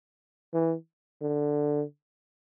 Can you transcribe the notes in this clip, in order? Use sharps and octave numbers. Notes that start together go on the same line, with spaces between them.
E3
D3